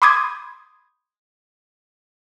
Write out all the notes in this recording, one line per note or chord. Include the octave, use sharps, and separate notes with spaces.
B5 C6 D6 D#6 G6 G#6